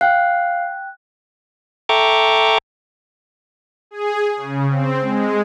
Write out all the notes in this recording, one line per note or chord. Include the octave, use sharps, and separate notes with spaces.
F5 G5 F#6
A4 E5 G5 A#5 C#6 D6
G#4
C#3
C4
G#3